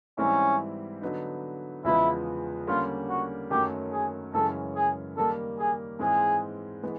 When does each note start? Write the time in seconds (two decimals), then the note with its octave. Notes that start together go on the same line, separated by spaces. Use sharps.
0.18 G#2 E3 G3 C4 C#4 E4
1.02 D3 F#3 B3 D#4
1.84 E2 C#3 F3 G#3 B3 E4
2.67 D3 G3 A#3 C#4 F4
3.09 F#4
3.51 F#2 D#3 F#3 A3 C#4 G4
3.92 G#4
4.33 F#2 C#3 E3 G#3 C#4 A4
4.75 G#4
5.17 D#3 G3 A#3 A4
5.59 G#4
5.99 G#2 E3 G#3 C4 G#4
6.83 E3 G#3 B3